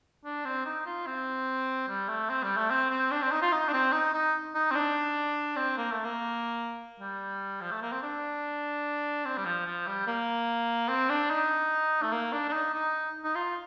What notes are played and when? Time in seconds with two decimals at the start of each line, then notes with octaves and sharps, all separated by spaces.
0.25 D4
0.45 C4
0.65 D#4
0.86 F4
1.06 C4
1.89 G3
2.09 A3
2.30 C4
2.43 G3
2.57 A3
2.70 C4
2.91 C4
3.11 D4
3.22 C4
3.31 D#4
3.42 F4
3.52 D#4
3.68 D4
3.73 C4
3.92 D#4
4.13 D#4
4.55 D#4
4.71 C4
4.75 D4
5.56 C4
5.77 A#3
5.91 A3
6.05 A#3
7.00 G3
7.61 F3
7.71 A3
7.82 A#3
7.92 C4
8.03 D4
9.25 C4
9.37 G3
9.45 F3
9.66 F3
9.87 G3
10.07 A#3
10.89 C4
11.10 D4
11.30 D#4
12.02 A3
12.12 A#3
12.32 D4
12.49 D4
12.52 D#4
12.73 D#4
13.24 D#4
13.35 F4